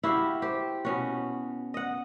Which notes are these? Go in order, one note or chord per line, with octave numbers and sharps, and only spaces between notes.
E4 F#4 G4 F5
G4 C5
B2 C#4 F#4
D#5 F#5